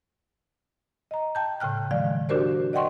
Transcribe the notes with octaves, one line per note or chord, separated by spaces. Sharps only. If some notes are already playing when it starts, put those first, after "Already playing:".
D#5 A#5
G5 A5 G6
A2 C#3 G5 F6 F#6
D#3 F3 G#3 D5 F5
D4 F#4 G4 A#4 C5 D5
D5 D#5 F#5 G5 C6 C#6